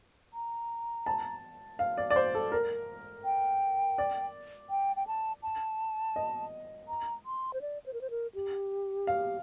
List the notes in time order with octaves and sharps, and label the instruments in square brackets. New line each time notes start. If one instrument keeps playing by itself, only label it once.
[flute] A#5
[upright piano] A5
F5
D5
D5
C5
A4
A#4
[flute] G5
[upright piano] D5
[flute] G5
G5
A5
A5
[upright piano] D#5
[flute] A#5
C6
C5
D5
C5
A#4
C5
A#4
G4
[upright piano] F5